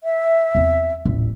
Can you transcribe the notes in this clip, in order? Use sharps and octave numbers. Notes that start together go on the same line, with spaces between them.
E5
E2 C4
D#1 A1